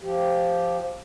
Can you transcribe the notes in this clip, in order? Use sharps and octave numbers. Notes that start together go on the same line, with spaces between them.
F3 G4